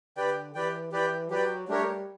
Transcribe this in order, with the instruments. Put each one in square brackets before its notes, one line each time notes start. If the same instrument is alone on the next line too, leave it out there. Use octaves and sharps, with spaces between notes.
[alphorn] D3 [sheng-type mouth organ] G4 B4 D5 G5
[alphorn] E3 [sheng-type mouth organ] G4 B4 D5 G5
[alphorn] E3 [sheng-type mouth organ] G4 B4 D5 G5
[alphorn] F#3 [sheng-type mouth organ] G4 B4 D5 G5
[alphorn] G3 [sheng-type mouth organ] A3 D4 G4 A#4 C#5